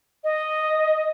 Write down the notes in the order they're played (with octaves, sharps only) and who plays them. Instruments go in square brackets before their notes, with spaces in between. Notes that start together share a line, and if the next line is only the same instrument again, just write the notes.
[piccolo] D#5